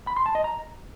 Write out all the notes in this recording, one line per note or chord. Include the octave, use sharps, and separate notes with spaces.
B5
C6
A5
D#5
A#5